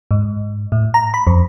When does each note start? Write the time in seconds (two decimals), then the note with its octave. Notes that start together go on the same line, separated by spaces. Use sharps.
0.11 G#2
0.72 A2
0.94 A#5
1.14 B5
1.27 F2